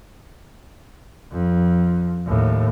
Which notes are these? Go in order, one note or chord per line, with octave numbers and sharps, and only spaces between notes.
F2
D#2 A2